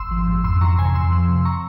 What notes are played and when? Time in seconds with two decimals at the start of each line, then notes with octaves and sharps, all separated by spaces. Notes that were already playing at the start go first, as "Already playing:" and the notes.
Already playing: G#1 C6 E6
0.11 F3
0.27 G#2
0.44 F2 C6 E6
0.61 E3 A#5 C#6
0.78 C3 G#5 C6
0.95 F2 C6 E6
1.12 F3
1.28 C3
1.45 A#5 C#6